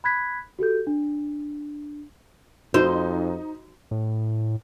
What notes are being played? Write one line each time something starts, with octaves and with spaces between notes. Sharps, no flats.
B5 F#6 G#6 B6
F#4 G4 A4 G6
D4
F2 D#4 F#4 C5
A2